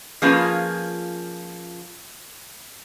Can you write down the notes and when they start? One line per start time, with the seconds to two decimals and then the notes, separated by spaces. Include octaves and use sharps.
0.22 F3 A#3 C#4 F4 G#4 B4